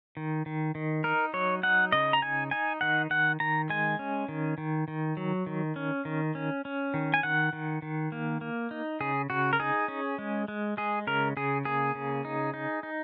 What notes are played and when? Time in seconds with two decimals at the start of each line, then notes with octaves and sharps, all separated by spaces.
0.17 D#3
0.46 D#3
0.75 D#3
1.04 D#4 A#4
1.33 F#3 C#5
1.63 D#4 F#5
1.92 C#3 D#5
2.13 A#5
2.22 D#4 G#5
2.51 D#4 G#5
2.81 D#3 F#5
3.10 D#3 F#5
3.40 D#3 A#5
3.70 G#3 G#5
3.99 C#4
4.29 D#3
4.58 D#3
4.88 D#3
5.17 F#3
5.47 D#3
5.76 C#4
6.05 D#3
6.35 C#4
6.65 C#4
6.94 D#3
7.14 G#5
7.23 D#3 F#5
7.53 D#3
7.82 D#3
8.12 A#3
8.41 A#3
8.71 D#4
9.00 C#3 G#4
9.30 C#3 F#4
9.53 A#4
9.60 D#4 G#4
9.88 C#4
10.18 G#3
10.48 G#3
10.77 G#3 G#4
11.07 C#3 A#4
11.37 C#3 G#4
11.65 A#3 G#4
11.95 C#3
12.25 D#4
12.54 D#4
12.83 D#4